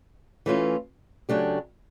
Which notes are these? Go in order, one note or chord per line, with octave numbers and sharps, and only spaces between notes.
E3 A3 C#4 F4
C#3 F#3 A3 D4 G4